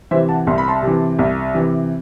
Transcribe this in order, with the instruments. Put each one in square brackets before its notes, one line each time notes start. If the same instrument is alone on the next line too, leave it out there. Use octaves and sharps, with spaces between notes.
[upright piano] C3 E3 C5 E5
F#5 A5
C2 C6
B5
A5 C6
C3 E3
C2
C3 E3